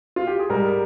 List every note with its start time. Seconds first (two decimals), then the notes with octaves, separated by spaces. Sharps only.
0.16 F4
0.27 G4
0.39 G#4
0.49 G#2 G3 A#4